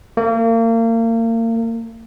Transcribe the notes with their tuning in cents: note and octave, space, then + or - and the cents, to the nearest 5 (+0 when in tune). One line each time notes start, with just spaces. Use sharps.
A#3 -35